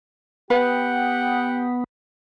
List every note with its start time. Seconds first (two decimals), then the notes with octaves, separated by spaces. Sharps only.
0.50 B3 G4 B4 F#5 G5